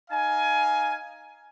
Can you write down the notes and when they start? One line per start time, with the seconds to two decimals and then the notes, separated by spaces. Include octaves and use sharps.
0.11 D#4 F5 G#5